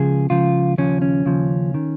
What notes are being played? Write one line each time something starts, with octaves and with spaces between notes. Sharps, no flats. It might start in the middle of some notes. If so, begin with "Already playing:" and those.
Already playing: C#2 C#3 F3 G#4
C#2 C#3 F3 F4
D#2 C#3 F3 C#4
C#4
D#2 C#3 F3
D#3